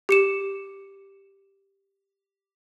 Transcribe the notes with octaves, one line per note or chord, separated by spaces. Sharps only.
G4 C#7 E7